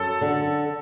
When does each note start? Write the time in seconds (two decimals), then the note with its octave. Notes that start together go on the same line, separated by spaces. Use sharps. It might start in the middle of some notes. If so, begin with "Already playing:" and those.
Already playing: F#2 A4
0.21 D3